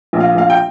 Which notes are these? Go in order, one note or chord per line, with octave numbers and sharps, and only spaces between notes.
A#1
F5
A#1 F5
G5